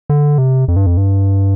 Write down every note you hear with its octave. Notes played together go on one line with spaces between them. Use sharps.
D3
C3
F2
G2
F2
G2